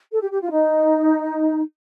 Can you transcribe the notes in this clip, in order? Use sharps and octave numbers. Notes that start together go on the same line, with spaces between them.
A4
G4
G4
F4
D#4